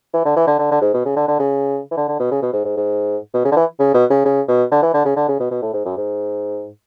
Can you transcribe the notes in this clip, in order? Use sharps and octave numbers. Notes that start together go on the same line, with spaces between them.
E3
D3
E3
D3
D3
D3
G#2
B2
C#3
D3
D3
C#3
E3
D3
D3
B2
C#3
B2
G#2
G#2
G#2
B2
C#3
D3
E3
C#3
B2
C#3
C#3
B2
D3
E3
D3
C#3
D3
C#3
B2
B2
A2
G#2
F#2
G#2